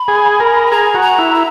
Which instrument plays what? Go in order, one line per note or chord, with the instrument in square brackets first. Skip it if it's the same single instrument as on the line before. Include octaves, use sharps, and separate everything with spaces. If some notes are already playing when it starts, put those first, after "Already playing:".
Already playing: [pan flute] B5
[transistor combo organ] G#4
A#4
[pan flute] G#5
[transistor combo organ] G#4 [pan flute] A#5
[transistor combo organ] F#4
[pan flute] A#5
[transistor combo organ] E4
[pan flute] A#5